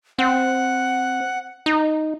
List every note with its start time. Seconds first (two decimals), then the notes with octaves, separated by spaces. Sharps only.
0.19 C4 F#5
1.66 D#4